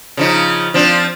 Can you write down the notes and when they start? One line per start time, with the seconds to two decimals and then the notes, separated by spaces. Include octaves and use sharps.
0.17 C#3 F3 D#4
0.74 F3 C4 D4